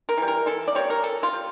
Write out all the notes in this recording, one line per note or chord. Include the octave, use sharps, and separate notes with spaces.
A#4
E3 G3
A#4
E3 A4
D5
G3 A#3 C#5
A#4
E3 A4
F4
G3